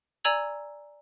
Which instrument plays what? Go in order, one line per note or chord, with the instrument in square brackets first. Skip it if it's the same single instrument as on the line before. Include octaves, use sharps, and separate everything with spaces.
[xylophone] D5 G#5 A#5 E6 G#6 F#7